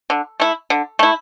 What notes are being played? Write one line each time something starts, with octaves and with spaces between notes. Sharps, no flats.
D3
A3 E4
D3
A3 E4